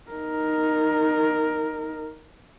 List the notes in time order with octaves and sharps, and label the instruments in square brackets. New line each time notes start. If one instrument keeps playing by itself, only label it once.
[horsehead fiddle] D#4 A#4